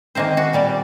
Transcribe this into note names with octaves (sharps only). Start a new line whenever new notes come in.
D#3 G#3 A#3 C4 C5
F#4
A#2 G3 D5